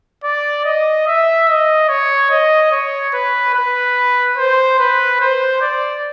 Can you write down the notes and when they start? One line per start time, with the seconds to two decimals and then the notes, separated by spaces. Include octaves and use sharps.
0.24 D5
0.65 D#5
1.07 E5
1.48 D#5
1.89 C#5
2.30 D#5
2.72 C#5
3.14 B4
3.54 B4
4.37 C5
4.79 B4
5.20 C5
5.61 D5